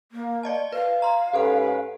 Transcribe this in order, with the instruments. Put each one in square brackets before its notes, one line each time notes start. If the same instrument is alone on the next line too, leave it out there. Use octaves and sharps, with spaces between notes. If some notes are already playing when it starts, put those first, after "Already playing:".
[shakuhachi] A#3
[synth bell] D5 D#5 A5
[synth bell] B4 [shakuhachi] F5
[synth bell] A#5 C6
[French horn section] G#2 C#4 B4 [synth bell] G4 A4 F#5